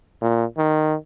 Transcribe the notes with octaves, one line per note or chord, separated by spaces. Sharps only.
A#2
D#3